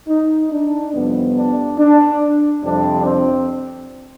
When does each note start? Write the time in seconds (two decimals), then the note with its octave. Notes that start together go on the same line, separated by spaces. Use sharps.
0.08 D#4
0.51 D4
0.93 F2 C3 G3 B3
1.36 D4
1.78 D4
2.63 F2 C3 G3 C4 D4
3.05 C4